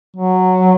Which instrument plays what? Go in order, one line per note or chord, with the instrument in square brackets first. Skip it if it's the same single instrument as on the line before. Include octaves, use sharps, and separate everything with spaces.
[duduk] F#3